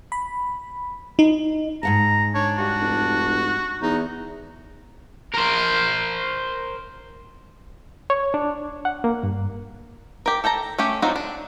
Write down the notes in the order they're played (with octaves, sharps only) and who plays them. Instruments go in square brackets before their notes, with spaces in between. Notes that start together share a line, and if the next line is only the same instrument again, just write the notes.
[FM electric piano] B5
D#4
[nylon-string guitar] G#2 F#5 A5 [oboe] A#5
[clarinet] D4 [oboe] C#5
[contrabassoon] G2 [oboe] F#4
[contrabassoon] F1
[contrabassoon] E2 [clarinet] D#4
[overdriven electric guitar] A#4 C5
[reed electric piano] C#5
D4
F#5
A#3
G2
[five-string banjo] G4 A#4
A4 G5 A5 A#5
A3 C#4 G4
F#3 C4 D#4 F4 F#4
D4